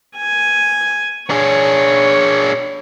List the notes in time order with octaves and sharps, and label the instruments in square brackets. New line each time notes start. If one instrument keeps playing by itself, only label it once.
[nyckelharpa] G#5
[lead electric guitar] D4 G#4 [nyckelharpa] C#5